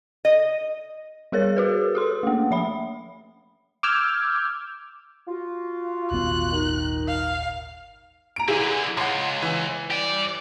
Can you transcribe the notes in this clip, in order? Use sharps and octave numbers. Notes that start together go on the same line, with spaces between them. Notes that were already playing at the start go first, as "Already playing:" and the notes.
D#5
G3 G#4 A#4 C#5 A6
F#4 G#4 B4
G4 A4 C6
A3 A#3
F3 E5 B5
D6 E6 F6 G6 G#6
F4 F#4
D#1 G#1 B3 F#6
D#3 D#4
F5
A#5 D7
D3 E3 E4 G#4
C#2 F#5 C6
E3
G4 D5